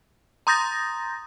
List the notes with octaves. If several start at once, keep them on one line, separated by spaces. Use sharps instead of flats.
A#5 C6 D#6 G6 A6 A#6